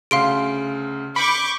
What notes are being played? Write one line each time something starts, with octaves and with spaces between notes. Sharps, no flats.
D2 C#3 F5 C6 D7
B5 C#6 D6 G6